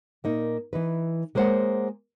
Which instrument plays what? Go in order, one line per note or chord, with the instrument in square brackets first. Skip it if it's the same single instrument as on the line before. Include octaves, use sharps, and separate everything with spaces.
[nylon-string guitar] A#2 A#3 D#4
E3 D#4 B4
G#3 A#3 A#4 C5 C#5 F#5